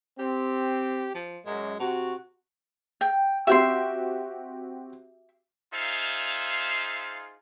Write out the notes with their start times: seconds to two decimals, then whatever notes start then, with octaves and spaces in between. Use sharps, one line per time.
0.19 C4 G4
1.15 F3
1.46 F#2 G#3
1.80 C3 F#4
3.01 G5
3.47 C4 F#4 G4 E5 G5 C6
5.73 D#4 F4 G#4 C5 E5 F5